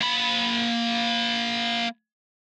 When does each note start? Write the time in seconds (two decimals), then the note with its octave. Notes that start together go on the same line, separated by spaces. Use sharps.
0.01 A#3 B5